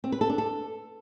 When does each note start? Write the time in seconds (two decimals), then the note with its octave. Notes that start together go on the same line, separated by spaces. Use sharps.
0.04 C4
0.12 B4
0.21 A4
0.30 D4
0.38 A4